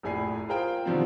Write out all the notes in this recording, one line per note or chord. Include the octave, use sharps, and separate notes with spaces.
F1 A#1 A2 G#5 B5 C7
F4 G#4 A#4 C5 G5
B2 D3 D#3 F3 G3 C4